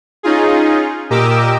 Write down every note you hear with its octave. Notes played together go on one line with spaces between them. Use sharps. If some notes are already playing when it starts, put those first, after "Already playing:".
C#4 D#4 F4 G#4
A#2 G4 A#4 D#5 D6 E6